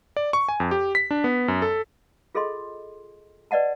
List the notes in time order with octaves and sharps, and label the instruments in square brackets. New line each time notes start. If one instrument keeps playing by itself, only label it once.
[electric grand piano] D5
C#6
G#5
F2
G4
B6
D4
B3
F#2
A4
[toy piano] F4 G#4 A4 D#5 C6
B4 D5 D#5 F#5 A5